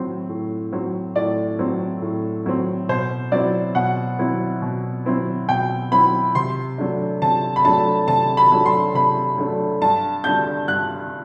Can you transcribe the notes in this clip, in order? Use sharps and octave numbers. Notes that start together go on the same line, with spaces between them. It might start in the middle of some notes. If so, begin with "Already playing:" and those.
Already playing: A2 F#3 C4
A2
F#3 C4
A2 D5
F#3 C4
A2
F#3 C4
B2 C5
F#3 C4 E4 D5
B2 F#5
F#3 C4 E4
B2
F#3 C4 E4
B2 G5
F#3 C4 E4 B5
C3 C6
F#3 A3 D4
C3 A5
B5
F#3 A3 D4 A5
C3 A5
B5
F#3 A3 D4
C6
C3 B5
F#3 A3 D4
G2 A5
D3 G3 D4 G6
G2 F#6